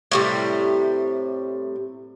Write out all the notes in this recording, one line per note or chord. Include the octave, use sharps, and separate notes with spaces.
A2 C3 G3